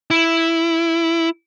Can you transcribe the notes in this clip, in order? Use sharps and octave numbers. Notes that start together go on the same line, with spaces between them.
E4